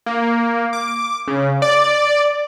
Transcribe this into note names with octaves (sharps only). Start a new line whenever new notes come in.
A#3
D6
C#3
D5